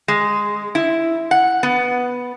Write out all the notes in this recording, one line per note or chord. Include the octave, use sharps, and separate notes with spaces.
G#3
E4
F#5
B3